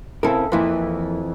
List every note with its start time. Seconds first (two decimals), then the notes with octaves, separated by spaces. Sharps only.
0.23 C#3 C4 E4 A4 A#4
0.52 F2 E3 F3 A#3 E4